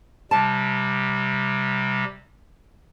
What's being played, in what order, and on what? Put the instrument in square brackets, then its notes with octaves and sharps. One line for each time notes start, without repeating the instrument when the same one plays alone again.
[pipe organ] C3 G3 [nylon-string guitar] A5